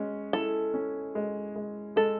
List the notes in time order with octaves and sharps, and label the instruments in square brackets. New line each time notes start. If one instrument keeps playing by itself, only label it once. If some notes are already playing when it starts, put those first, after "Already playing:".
Already playing: [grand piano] G#3 C#4
[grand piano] E4 [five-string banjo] A4
[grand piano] C#4
G#3
G#3
[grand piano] G#3 [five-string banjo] A4